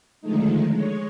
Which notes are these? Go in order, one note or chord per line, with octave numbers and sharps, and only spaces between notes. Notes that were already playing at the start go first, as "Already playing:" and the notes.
D3 D#3 F3 G#3 A3 D#4
G#3 C#5